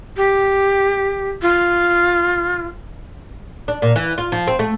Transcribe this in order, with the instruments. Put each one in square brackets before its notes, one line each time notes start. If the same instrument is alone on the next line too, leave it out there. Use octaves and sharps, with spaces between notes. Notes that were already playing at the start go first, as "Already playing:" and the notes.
[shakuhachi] G4
F4
[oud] D4
A#2
E3
F4
F3
C4
A3